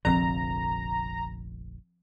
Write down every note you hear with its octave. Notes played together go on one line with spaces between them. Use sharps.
F1 A#1 D3 F3 C4 A#5